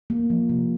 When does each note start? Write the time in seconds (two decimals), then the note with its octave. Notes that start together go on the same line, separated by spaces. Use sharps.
0.10 A#3
0.30 F3
0.49 C3